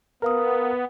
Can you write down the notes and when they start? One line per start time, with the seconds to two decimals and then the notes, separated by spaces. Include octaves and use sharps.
0.22 B3 A#4 B4 F5 D#6